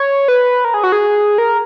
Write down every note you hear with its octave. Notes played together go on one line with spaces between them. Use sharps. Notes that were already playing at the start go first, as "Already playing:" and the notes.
Already playing: C#5
B4
A#4
G#4
F#4
G#4
A#4